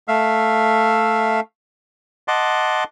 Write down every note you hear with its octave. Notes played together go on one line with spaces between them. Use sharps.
A3 E5 F5
D#5 F#5 A5 C6 D6